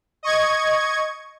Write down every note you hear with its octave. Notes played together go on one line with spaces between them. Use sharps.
D#5 C#6 G#6